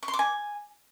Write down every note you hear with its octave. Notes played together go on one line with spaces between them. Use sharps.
C#6
C6
D6
G#5